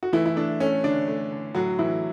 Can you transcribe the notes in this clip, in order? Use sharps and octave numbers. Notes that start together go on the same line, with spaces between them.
F#4
E3 A3 E4
E4
A3 D4
A3 C#4
D3 D4
A3
D3
A2 F#3 F#4
A2 E3 E4